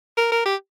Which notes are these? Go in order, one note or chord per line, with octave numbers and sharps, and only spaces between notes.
A#4
A#4
G4